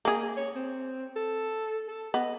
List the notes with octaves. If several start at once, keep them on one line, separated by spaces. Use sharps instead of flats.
A#3 G#4
C#5
C4
A4
A4
B3 D#5